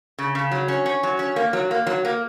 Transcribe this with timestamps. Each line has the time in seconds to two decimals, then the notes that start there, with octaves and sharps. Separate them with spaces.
0.18 C#3
0.35 C#3
0.51 F#3
0.68 C#4
0.86 C#4
1.03 F#3
1.19 C#4
1.36 A#3
1.53 F#3
1.71 A#3
1.87 F#3
2.05 A#3